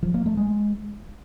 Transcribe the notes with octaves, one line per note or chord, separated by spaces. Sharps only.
F3
A#3
A3
G#3